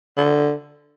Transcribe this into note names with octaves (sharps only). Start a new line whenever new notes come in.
D3